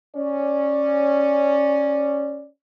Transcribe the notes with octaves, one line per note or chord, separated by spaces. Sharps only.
C#4 D5